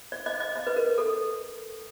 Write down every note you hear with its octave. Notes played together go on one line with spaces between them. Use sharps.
D5
D#5
D#5
D#5
B4
A#4
A4